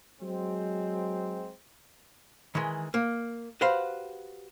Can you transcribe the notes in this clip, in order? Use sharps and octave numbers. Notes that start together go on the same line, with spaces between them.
F#3 G#3 C4
D#3 E3 G#3
A#3
F#4 G4 B4 C5 F5